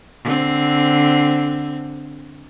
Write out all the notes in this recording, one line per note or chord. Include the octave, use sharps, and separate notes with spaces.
D3 C4